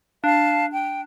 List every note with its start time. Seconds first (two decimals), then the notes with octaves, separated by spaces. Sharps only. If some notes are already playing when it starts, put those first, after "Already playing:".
0.24 D4 F5 A5
0.72 G5